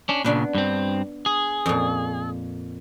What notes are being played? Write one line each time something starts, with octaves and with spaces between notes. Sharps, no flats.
C#4 D4
A#2 C#3 B3 D4 B4
G2 C4
G#4
F2 A#2